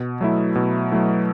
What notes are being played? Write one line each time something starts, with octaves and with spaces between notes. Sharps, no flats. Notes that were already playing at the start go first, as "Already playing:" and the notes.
Already playing: B2
F#3 A3 E4
B2
F#3 A3 E4